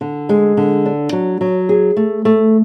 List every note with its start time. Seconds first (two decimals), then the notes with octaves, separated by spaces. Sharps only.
0.01 D3
0.29 G#3
0.57 D3
0.85 D4
1.13 F#3
1.41 F#3
1.69 G#4
1.97 A3
2.25 A3